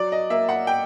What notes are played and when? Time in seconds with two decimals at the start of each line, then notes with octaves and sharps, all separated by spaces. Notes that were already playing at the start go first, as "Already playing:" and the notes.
Already playing: F#3 D5
0.12 D#5
0.30 A#3 E5
0.49 F#5
0.67 G5